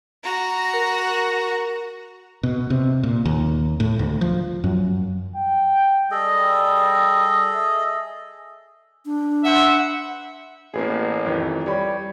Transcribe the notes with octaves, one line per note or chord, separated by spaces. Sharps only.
F#4 A#5
A#4
B2
C3
A#2
D#2
A2
D2
F3
F#2
G5
G3 G#4 A4 D#5
E5
D4
B4 C5 E5 F#5
A1 A#3 B3 G#4
F2 D#3 E3
G3 C#5 B5